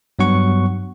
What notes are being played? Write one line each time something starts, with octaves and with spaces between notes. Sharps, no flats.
G2 F#3 B3 F#5 C#6